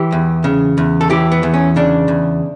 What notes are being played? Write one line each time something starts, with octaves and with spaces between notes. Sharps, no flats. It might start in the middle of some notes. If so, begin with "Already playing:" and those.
Already playing: E3 G4
E2
C#3
E2
A4
E3 G4
B3
E2
C#4
C#3 D4
E2